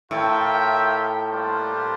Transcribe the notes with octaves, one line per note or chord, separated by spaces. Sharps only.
A2 F4 A#4 E5 G5
G3 A#3 D4 F4 C5